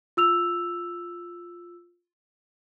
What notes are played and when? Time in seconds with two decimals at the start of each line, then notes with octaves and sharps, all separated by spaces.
0.17 F4 E6 F7